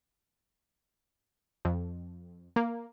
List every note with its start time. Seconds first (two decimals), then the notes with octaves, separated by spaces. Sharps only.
1.65 F2
2.56 A#3